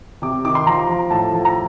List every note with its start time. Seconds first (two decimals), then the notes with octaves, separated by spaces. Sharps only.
0.22 C3 D6
0.45 D#3 D6
0.55 C6
0.66 F3 A#5
0.89 F3
1.10 A2 A5
1.32 F3
1.45 A#5